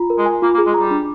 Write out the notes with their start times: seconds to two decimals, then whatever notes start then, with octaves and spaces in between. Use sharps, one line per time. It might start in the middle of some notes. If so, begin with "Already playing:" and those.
Already playing: F4 A#5
0.10 A#4
0.18 G#3
0.26 G#5
0.42 A#3 F4
0.54 A#3
0.58 G#4
0.67 G#3
0.74 G3 A#5
0.91 D4